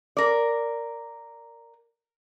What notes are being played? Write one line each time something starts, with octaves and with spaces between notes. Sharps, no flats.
A#4 D5